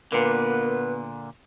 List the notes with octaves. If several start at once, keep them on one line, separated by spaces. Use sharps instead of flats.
A#2 D3 A#3 B3 B4